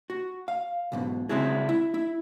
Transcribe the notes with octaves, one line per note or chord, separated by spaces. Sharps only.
F#4
F5
B1 G#2 B2
C#3 G#3 C4 E4 F#4 G#4
E4
E4